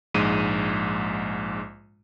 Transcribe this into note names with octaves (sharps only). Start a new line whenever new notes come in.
A#1 G#2 G#3 D#7